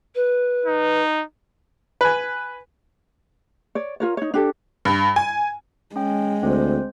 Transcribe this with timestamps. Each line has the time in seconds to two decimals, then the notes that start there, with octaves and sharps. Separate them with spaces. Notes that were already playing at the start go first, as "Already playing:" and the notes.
0.15 B4
0.66 D#4
2.01 B4 G#5
3.75 C#5 D5
4.00 F4 A#4 C#5
4.17 D#4 C#5
4.34 D4 G4 A4
4.85 G2
5.16 G#5
5.96 G#3 C#4 G5
6.43 D2 C4 C5